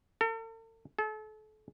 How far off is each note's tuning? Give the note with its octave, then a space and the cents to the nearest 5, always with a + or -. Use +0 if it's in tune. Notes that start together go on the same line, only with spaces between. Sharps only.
A4 +45
A4 -35